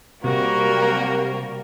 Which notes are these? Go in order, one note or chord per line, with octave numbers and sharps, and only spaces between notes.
C3 G3 A#3 F#4 A#4